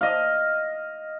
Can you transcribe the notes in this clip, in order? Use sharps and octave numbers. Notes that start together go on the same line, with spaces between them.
D#5 F5